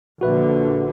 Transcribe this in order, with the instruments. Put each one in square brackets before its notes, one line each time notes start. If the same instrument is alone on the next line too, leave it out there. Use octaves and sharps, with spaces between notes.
[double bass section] A#1 D3 [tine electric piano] F#4 B4 E5